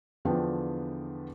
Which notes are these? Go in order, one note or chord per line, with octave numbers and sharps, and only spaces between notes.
E2 D3 F3 B3 D4 G5